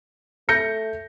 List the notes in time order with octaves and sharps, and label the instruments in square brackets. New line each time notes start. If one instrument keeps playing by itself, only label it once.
[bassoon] A3 [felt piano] G6 A#6 C#7